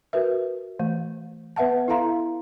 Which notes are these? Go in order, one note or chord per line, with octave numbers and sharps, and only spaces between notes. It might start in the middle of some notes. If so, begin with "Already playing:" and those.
F#4 A#4 B4 E5
E3 A3
B3 B4 E5 F#5 A5
E4 A4 E5 F5 A#5 C6